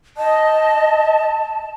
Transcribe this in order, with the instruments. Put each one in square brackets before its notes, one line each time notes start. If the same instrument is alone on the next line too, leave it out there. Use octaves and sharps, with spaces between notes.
[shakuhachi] D#5 [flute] A5